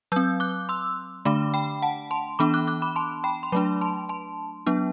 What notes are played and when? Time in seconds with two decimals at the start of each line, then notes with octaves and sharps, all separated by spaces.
0.12 F#3 E6 G6
0.16 C4
0.40 D6 F#6
0.69 C6 E6
1.25 D3 A3 D4 B5 D6
1.54 G5 B5
1.82 F#5 A5
2.11 A5 C6
2.39 E3 B3 D4 B5 D6
2.54 D6 F#6
2.67 D6 F#6
2.82 B5 D6
2.96 A5 C6
3.24 G5 B5
3.43 C6
3.52 F#3 A3 D4 B5 D6
3.81 A5 C6
4.09 A5 C6
4.67 F#3 B3 D4